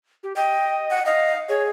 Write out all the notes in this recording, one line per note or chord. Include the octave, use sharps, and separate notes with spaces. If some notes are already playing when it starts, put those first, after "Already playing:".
G4
D#5 G5
F#5
D#5 F5
G#4 C#5